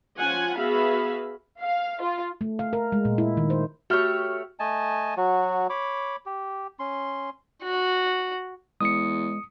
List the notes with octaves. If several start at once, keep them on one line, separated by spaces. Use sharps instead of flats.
F3 C#4 F4 F#5 G#5
B3 F#4 G#4 E5 F5 B5
F5
F4
A3
F5
A#4
G#3
A#2
E4
D#3
C5
A3 F#4 G4 C#5 F6
A3 D#5 G#5 A5
F#3 F#4
C#5 B5 D6
G4
C#4 C6
F#4
E2 G#3 D#6 C#7